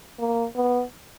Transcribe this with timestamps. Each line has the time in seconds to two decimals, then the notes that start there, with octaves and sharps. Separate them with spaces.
0.19 A#3
0.56 B3